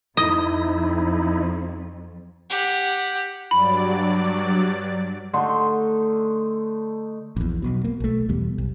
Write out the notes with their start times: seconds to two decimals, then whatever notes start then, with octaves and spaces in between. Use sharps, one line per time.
0.17 F2 D#4 E4 D#5
2.50 G4 F#5
3.51 G2 F#3 D5 B5
5.33 D3 A3 D#4 C6
7.36 A#1 E2
7.62 B1 B2
7.84 A#3
8.00 B1 A3
8.29 E2 B2 G3
8.58 B1